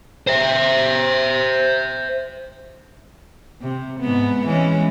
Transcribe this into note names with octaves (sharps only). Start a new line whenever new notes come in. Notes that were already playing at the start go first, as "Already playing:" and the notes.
C5 E5
C3
G#2 B3
E3 G#3 C#4